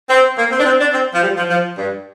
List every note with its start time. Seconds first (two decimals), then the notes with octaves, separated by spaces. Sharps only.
0.09 C4
0.37 A#3
0.51 C4
0.59 D4
0.65 C4
0.79 D4
0.93 C4
1.12 F3
1.21 G3
1.35 F3
1.49 F3
1.77 G2